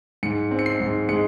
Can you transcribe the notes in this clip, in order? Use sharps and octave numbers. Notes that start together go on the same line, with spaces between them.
G#2 C#7
C4
C#7
C7
G#2
G#3 C#7